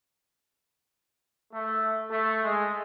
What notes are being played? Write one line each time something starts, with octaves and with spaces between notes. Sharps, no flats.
A3
A3
G#3